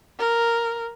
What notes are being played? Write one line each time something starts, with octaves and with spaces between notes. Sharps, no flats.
A#4